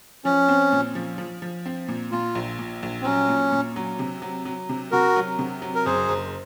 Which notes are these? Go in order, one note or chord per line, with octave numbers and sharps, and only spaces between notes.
F3 C#4
C4
A#2
F3
F3
F3
C4
A#2
A#2 F4
A#1
A#2
A#1
C4
F#3 C#4
A#2
A#2
F#3
C3
F#3
F#3
C3
C3 F#4 A#4
F#3
C3
F#3
A#4
F#1 G#4 C5
F#1